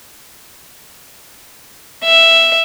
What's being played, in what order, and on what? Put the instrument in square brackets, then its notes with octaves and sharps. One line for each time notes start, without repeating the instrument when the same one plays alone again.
[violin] E5